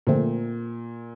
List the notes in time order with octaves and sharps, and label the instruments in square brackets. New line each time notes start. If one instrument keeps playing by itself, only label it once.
[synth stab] F2 D3 F3 A3 C4 [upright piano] A#2